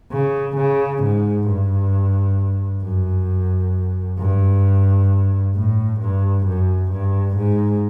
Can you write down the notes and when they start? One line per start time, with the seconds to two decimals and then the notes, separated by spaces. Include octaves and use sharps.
0.13 C#3
0.57 C#3
1.03 G#2
1.48 G2
2.84 F#2
4.19 G2
5.55 A2
6.00 G2
6.46 F#2
6.92 G2
7.37 G#2